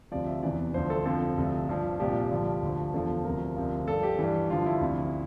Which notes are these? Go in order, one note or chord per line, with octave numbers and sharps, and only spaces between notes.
D2 C3 F3 D5
E5
E2 C3 E3 D5
D2 D3 F3 C5
A4
F2 D3 F3 A4
D2 C3 F3
G2 F3
C2 A#2 F3 G4
G2 D3 F3
D2 D3 F3
E2 D3 F3 A4
D2 C3 F3 A#4
D2 C3 F3
G2 F3 A4
G4
G2 E3
G2 D3 F3 F4
E4
D2 C3 F3